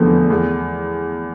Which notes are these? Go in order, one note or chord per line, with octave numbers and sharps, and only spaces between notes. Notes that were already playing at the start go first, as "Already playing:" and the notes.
Already playing: F1 E2 D3 F3 B3
E2